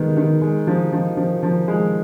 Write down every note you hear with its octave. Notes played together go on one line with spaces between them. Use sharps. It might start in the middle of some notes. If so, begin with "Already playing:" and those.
Already playing: D#3 G#3 B3 D#4
D#3
G#3
F3
F3
F3
F3
G#3